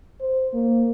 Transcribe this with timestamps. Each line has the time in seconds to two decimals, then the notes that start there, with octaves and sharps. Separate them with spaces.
0.21 C5
0.53 A#3